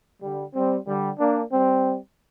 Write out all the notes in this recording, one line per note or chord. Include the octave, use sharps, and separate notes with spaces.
D3 G3
G3 C4
D3 G3
A#3 D4
G3 C4